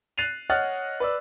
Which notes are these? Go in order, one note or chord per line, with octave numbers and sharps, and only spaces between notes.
F#6 A6 C7 D#7 F7
C#5 D#5 F#5 F6 F#6 A6
B4 D5 E6